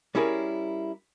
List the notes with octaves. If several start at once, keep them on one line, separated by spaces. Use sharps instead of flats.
G3 C#4 E4 G#4 A#4